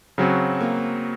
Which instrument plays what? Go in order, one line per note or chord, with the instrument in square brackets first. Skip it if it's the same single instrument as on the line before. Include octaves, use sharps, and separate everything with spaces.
[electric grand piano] C#3 F#3 C4 F#4
[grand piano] A#3